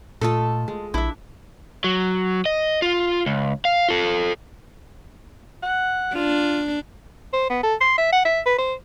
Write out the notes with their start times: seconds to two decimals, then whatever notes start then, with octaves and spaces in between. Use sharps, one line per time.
0.21 A#2 A3 F4 A4 D#5 A5
0.68 G#3
0.94 A#1 D4 E4 E5
1.84 F#3
2.46 D#5
2.82 F4
3.26 C#2
3.65 F5
3.89 F4 A4
5.63 F#5
6.15 D4 F4
7.33 C5
7.50 B3
7.63 A4
7.81 C6
7.98 E5
8.13 F#5
8.25 E5
8.46 B4
8.58 C5